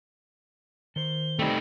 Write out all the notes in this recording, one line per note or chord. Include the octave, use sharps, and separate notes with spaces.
D#3 C5 G7
G3 A3 C4 D#4